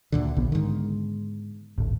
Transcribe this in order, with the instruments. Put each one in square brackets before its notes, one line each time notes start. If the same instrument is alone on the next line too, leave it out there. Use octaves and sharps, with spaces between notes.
[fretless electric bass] D2 A#2 D3
[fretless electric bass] A#1 [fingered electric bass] D3 B3
[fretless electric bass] G#2 D#3
[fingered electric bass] D1 G#1